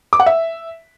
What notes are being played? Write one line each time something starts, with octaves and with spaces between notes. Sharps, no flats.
D6
F#5
E5